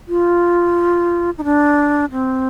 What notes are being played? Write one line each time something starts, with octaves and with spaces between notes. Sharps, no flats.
F4
D#4
D4
C4